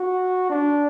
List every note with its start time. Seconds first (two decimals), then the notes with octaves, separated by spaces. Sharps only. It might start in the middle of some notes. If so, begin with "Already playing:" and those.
Already playing: F#4
0.50 D4